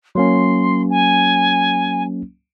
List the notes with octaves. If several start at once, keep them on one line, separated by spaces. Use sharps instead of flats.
F#3 A#3 C#4 C6
G#5